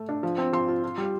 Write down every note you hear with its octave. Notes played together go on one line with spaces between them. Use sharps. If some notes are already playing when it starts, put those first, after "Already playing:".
Already playing: A3
D4
F3
C4
F3 C6
F4
F4
G3